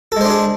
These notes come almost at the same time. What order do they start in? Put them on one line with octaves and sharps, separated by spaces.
A4 G#3 C5 D4 G#4